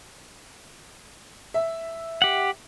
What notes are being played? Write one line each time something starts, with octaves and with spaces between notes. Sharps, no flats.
E5
G4 F#5